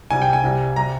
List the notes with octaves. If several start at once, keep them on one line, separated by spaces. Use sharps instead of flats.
C2 C3 G3 G#5
G5
G#5
C2 C3 G3
C3 G3 A#5